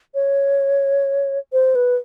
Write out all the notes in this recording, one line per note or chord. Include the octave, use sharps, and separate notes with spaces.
C#5
C5
B4